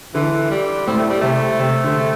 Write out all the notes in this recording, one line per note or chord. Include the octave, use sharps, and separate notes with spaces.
D3 E3
G3
A2 C4
A3
G3
C3 A3
C3
D3